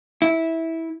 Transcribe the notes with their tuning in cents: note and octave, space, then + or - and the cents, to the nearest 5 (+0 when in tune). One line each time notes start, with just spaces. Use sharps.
E4 -15